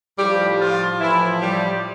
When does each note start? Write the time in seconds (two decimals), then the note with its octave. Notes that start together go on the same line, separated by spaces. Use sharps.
0.18 A2 F3 G3 G4
0.60 F3 F4
1.00 A2 E3 F3 E4
1.41 G3 G4